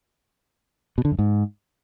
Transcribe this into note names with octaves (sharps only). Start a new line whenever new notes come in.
B2
D3
F#2
G#2